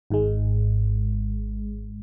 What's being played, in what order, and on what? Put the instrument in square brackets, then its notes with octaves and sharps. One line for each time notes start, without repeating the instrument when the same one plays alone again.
[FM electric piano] G#1 G#2 G#3